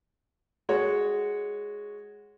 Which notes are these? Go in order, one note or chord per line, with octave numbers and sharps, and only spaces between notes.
G#3 F#4 C#5